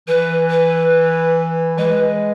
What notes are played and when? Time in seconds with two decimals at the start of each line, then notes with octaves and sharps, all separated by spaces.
0.08 E3 B4
0.50 B4
1.78 G#3 B4